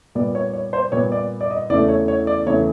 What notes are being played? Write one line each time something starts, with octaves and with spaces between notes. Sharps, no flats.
A#2 G3 B3 D5
C#5
C#5
C5
A#2 G3 B3 C#5
D5
D5
D#5
E2 C#3 E3 A3 D5
C#5
C#5
D5
E2 C#3 E3 A3 C#5